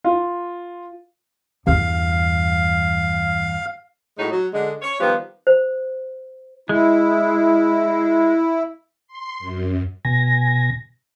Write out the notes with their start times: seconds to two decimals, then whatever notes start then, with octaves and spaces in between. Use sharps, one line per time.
0.04 F4
1.67 E2 G2 F5
4.18 A2 F#3 G#3 D#4 F#4
4.31 F#3
4.53 D3 G#3
4.82 C#5
5.00 D#3 F3 G3 B3
5.47 C5
6.69 G#3 E4
9.07 C6
9.39 F#2
10.05 B2 G#5 A#6